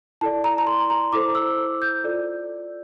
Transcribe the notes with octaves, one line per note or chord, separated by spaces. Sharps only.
E4 A4 D5 A5
A#5
A#5
C6
A#5
E4 A4 C5 D6
E6
G6
F4 A4 D5